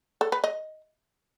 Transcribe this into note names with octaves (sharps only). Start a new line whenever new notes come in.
A4
B4
D#5